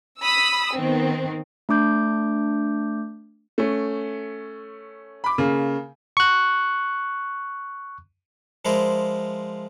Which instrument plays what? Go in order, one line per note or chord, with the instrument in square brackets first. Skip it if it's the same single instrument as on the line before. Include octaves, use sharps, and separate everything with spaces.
[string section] B5 D#6 E6
D#3 B3 C4
[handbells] A3 D4 D6 G6
[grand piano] A3 C#4
B5 D6
C#3 A#3
[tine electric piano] C#6 F#6
[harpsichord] F3 G#3 E4 A#4 C5 D5